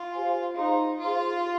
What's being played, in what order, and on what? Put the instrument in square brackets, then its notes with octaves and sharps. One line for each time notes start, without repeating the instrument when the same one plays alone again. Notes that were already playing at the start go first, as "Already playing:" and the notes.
Already playing: [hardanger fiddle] F4
[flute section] G4 C5 F5 G#5
[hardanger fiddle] D#4 [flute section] G#4 C5 F5 C6
[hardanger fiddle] F4 [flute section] G#4 C5 F5 C6
[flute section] G4